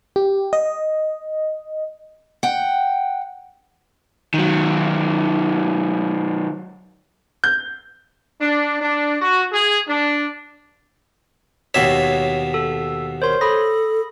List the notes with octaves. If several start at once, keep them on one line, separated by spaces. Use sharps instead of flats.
G4
D#5
F#5 G5
D#3 F#3
G6
D4
D4
F#4
G#4
D4
D#2 B2 C#5 E5
A4
A#4 C5 C#5 C6
A4 B5 D#6 A#6